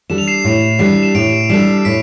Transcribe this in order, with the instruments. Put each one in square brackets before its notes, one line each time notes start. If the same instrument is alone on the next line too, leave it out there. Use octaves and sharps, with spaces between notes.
[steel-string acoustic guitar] G3 D4 A4 [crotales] E7
[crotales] F7
C7 E7
[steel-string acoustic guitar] A2
[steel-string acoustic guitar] G3 D4 A4 [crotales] C7
[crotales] E7
[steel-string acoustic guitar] A2 [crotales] D7 F7
[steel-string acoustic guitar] G3 D4 A4 [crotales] C7 E7
[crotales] C7
[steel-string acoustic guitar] A2 [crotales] B6 D7